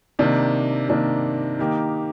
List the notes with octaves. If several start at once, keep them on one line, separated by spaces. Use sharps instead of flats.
C3 D#3 A#3 D4
C3 D#3 A#3 D4
D#3 A#3 D#4 G4